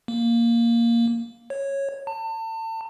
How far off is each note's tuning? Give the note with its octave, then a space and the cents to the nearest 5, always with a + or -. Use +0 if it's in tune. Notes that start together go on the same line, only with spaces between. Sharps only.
A#3 +0
C#5 -10
A5 +35